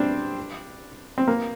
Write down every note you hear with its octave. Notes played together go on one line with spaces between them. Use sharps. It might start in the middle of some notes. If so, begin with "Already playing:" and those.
Already playing: G3 C4 D4
C4
A#3